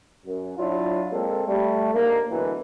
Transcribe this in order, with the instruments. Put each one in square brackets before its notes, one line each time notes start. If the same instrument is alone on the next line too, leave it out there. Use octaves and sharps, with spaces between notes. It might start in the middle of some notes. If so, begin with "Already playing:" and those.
[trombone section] F#2
F#3 D4 E4 F4
G#3 A#3 C4 A4
G3 A3
D#2 G#2 D3 A#3
D2 B2 D3 E3 F#3 A#4